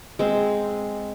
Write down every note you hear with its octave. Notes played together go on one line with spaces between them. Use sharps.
G#3 C4